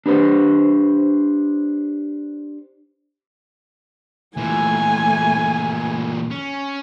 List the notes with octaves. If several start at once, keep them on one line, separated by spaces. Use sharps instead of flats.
D4 G4 B4 C5
A#2 E3 A3 G#5
C#4